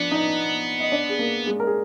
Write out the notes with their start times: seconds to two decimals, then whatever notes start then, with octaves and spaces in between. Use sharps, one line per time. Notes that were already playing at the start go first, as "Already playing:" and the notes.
Already playing: F3 B3 D4
0.11 D#4 D#5
0.80 D#5
0.92 D4 D5
1.09 G#4
1.19 A#3 A#4
1.46 G#3 G#4
1.60 A#4
1.67 G#4